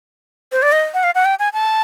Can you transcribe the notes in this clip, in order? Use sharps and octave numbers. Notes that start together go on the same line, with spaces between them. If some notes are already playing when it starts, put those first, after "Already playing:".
C5
D5
D#5
F#5
F5
F#5
G5
G#5
A5